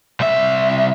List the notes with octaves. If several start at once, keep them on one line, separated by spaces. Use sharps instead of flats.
C2 E5